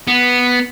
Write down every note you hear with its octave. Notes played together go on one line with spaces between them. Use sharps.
B3